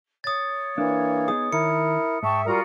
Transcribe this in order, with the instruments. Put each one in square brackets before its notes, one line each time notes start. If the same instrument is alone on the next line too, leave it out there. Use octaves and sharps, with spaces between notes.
[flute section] C#5 [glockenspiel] D#6 A6
[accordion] E3 A#3 [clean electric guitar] D4
[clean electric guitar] B3 D#4 G#4 [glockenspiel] D#6
[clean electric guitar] D#3 [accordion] E4 A#4 [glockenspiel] C#7
[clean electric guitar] G#2 [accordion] E5 [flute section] G5 A5 C#6
[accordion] G3 A#4 [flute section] F4 F#4 A#5